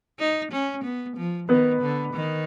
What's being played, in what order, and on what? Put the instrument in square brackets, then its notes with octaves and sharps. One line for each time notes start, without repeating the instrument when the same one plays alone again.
[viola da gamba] D#4
C#4
B3
F3
[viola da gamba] D#3 [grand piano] B3 B4
[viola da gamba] D3
D#3